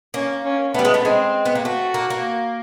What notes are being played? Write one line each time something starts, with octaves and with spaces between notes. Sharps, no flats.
A#3 C#4
C#4
G3 A3 B3
G#3
A3
G#3 C4
B3
A#3
A3 F#4
A#3
A#3